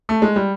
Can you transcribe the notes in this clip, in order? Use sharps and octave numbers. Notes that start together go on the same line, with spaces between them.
A3
G#3
G3